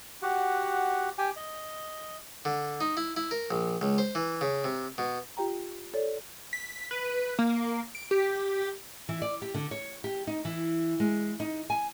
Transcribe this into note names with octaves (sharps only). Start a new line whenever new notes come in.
F#4 G4 F#5
G4 G5 G#5
D#5
D3
D#4
E4
E4
A#4
A#1
C#2
C5
E3
C#3
C3
B2
F4 G4 G5 A#5
A4 C#5 D5
B6
B4
A#3
D7
G4
E3
D5
G4
D3
C#5
G4
D#4
E3
G#3
D#4
G#5